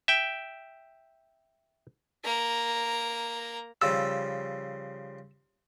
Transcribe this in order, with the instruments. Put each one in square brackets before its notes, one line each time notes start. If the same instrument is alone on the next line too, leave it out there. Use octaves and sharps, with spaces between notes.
[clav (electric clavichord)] E5 G5
[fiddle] A#3 A#5
[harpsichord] C#3 F3 G3 [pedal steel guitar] E6